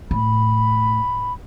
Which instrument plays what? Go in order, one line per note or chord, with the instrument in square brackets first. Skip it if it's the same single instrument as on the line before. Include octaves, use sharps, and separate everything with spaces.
[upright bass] A2 [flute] B5